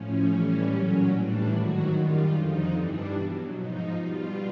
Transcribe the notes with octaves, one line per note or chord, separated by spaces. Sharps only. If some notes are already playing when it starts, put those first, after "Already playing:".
Already playing: A2 F3 C#4
A2 E3 G3
A#2 F#3 C#4
A2 E3 G3 D4
G#2 D#3 F#3 F#4
F#2 D#3 G3 F4
F2 D3 F3 D#4
G2 E3 G3 D4
B2 F#3
G#2 F3 D#4
B2 G3 F4